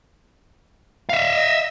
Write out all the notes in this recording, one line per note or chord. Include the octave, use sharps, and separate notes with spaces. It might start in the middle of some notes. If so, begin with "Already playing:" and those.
E5 F5
D#5